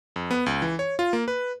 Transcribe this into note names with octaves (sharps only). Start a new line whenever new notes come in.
F2
B3
C#2
E3
C#5
F4
A#3
B4